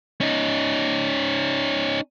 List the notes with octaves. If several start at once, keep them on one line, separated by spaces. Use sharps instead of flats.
C#4 D#4